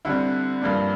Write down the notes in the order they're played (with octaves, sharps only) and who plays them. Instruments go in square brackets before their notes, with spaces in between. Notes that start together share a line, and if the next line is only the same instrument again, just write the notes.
[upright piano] D3 G3 C4 E4
G2 F3 A#3 D4